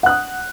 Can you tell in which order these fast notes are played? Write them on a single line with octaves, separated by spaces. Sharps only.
F#5 F#6 D#6